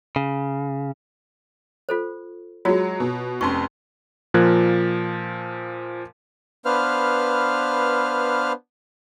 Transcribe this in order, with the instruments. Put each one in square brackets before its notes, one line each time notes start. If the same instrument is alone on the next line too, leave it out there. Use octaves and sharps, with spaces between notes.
[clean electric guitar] C#3
[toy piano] F4 A4 C5
[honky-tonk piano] F#3 G#3 [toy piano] F4 F#4 C#5
[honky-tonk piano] B2
[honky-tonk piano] F1 F2 C6 [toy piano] C#4 C#6
[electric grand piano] A#2 F3 A#4 F#6 G#6
[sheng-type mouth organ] B3 D4 B4 C5 F5 F6